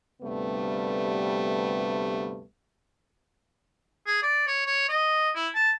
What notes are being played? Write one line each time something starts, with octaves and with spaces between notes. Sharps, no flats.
D2 G2 C3 G3 A3 B3
G#4
D5
C#5
C#5
D#5
E4
A5